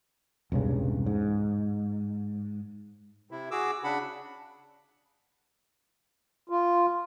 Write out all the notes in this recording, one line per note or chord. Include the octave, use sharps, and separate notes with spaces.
E1 C2 G2 C#3
G#2
C3 E4
F#4 G#4 D6 E6
C#3 D4 F#5 B5
F4